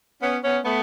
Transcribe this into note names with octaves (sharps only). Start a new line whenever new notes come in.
B3 C#4
B3 C#4
A3 B3